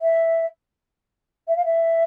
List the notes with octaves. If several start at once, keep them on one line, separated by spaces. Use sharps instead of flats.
E5
E5
F5
E5